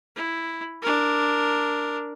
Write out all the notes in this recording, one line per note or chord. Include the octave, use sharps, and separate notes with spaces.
E4
D4 A#4